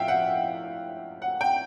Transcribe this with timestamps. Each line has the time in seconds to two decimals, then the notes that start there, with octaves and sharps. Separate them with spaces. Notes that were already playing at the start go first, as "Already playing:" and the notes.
Already playing: A2 F3 E5 F5 G5
0.08 F#5
1.22 F#5
1.41 G5